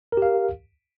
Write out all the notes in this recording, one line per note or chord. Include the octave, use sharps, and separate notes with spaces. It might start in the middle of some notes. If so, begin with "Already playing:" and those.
G4 A#4 F5